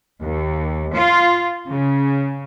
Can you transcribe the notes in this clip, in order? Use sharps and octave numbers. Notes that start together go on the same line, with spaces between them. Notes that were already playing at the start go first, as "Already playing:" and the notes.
D#2
F4
C#3